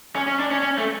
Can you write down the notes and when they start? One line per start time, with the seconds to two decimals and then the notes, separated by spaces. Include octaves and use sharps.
0.16 C#4
0.28 C#4
0.39 D4
0.51 C#4
0.63 C#4
0.78 A3